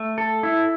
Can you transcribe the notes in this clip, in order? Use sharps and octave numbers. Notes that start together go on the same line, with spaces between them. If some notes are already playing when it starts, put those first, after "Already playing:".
Already playing: A3
A4
E4